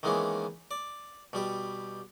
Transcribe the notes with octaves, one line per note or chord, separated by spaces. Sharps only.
D#3 E3 G#3 A#3 B3 C#4
D5
B2 G3 G4